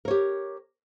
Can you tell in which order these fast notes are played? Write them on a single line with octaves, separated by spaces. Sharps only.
A#4 C#5 G4